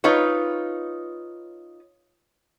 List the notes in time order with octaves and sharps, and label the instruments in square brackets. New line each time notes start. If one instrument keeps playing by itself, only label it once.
[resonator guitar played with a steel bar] D#4 F4 B4 C#5